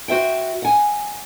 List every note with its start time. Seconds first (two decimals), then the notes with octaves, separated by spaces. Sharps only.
0.08 F#4 C5 E5 G5
0.62 F#5 G#5